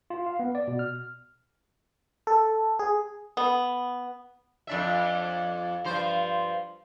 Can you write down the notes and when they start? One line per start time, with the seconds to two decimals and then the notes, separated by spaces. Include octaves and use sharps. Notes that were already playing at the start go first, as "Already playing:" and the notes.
0.10 F4
0.26 F5
0.39 B3
0.55 D5
0.68 B2
0.79 F6
2.27 A4
2.79 G#4
3.37 B3
4.67 F2 D4 E5
5.85 G2 F3 C5